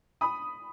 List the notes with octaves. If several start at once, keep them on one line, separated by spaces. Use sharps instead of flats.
B5 D#6